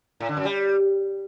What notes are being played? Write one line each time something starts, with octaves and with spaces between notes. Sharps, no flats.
A2
D3
F#2
G3